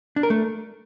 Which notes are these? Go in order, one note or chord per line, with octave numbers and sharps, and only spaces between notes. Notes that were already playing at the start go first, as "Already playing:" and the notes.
D4
A#4
A3